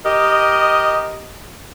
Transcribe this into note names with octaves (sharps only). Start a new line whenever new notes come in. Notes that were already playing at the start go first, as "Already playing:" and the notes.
G4 A#4 D#5